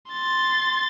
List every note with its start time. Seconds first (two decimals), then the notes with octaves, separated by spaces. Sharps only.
0.12 C6 A6